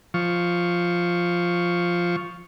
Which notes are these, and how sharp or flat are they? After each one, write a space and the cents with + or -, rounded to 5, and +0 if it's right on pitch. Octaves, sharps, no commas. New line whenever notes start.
F3 +0 C#6 +0